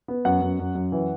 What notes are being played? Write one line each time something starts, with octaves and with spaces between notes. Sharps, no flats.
B3
F#2 F#5
F#2
F#2
F#2
E3